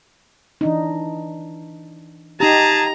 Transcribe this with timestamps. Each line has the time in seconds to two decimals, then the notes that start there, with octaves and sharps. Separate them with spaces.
0.61 E3 D4 D#4
2.40 D#4 G4 G#4 A5 A#5